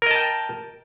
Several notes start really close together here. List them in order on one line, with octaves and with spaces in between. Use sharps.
A#4 D#5 A5 G5